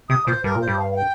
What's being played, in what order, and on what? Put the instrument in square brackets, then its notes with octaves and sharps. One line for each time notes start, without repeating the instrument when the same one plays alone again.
[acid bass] C3 [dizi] D#6
[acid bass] A#2 [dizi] C5
[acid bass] G2 [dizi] A#4
[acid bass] A#2
[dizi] C5
[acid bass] G2
[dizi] F5
F5
G5